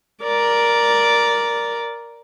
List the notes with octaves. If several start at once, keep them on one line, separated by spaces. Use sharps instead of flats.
A#4 D5